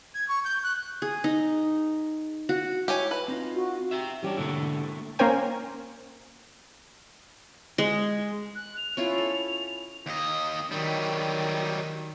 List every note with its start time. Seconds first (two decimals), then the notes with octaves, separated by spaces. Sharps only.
0.14 G#6
0.28 C#6
0.45 G6
0.63 F#6
1.02 G#4
1.24 D#4
2.49 F#4
2.88 E4 G4 C#5 G#5
3.11 B4
3.28 C4 D#4 F4
3.54 F#4
3.91 G4 E5
4.23 E3 G3 C#4 D4 G4
4.37 G#2 B2 D3 A3 A#3 E4
5.19 A#3 C#4 A#4 C5 G5 G#5
7.78 G#3
8.55 F#6
8.77 F7
8.97 C#4 E4 F4
9.18 A4
10.06 D#2 D#5
10.71 D#3 F#3 G3